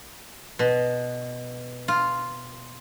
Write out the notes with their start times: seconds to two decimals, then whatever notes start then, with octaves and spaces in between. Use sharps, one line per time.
0.59 B2
1.88 F4